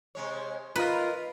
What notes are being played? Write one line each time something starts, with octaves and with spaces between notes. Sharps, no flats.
C3 G#3 C#5
D#4 F4 A#4 B4 D#5